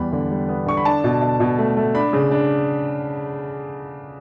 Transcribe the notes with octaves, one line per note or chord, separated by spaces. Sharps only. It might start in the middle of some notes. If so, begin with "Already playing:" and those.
Already playing: E2 G3 B5
D3
G3
B3
D3 C#6
B5
D4 A5
B2
B2
B2
A3
A3
D4 B5
C#3
D4